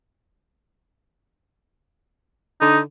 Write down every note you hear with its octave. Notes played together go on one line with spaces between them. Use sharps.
D3 D#4